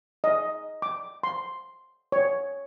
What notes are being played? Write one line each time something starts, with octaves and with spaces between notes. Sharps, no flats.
D#5
D6
C6
C#5